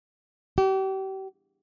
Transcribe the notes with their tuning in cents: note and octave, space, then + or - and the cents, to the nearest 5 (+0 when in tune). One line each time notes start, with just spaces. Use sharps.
G4 -35